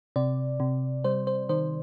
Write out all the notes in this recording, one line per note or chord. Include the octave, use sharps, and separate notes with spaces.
C3 D5
C3
G3 C5
C5
D#3 C5